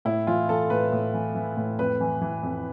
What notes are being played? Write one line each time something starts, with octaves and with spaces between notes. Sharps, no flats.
A2 E4
E3 F4
E3 A4
A2 B4
A2
E3
E3
A2
F2 B4
E3
E3
F2